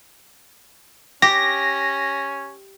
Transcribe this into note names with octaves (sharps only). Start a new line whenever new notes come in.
C#4 G4 A#6